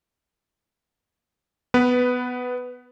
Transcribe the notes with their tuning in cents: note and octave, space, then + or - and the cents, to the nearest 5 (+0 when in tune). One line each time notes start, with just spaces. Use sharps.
B3 +10 B4 +0